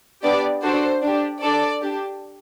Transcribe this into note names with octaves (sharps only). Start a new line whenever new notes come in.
B3 D4 G4 D5
D4 F#4 A4 C5
D4 G4
D4 A4 D5
D4 G4